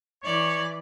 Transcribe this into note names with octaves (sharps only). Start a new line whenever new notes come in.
E3 C#5 D5